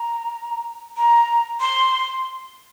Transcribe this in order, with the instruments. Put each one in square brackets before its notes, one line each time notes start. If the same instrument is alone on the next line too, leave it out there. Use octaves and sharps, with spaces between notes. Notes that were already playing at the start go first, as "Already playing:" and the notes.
Already playing: [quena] A#5
A#5
C6